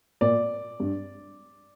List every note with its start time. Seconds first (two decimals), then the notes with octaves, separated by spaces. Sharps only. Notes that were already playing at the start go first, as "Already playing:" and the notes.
0.21 A#2 D5
0.80 G2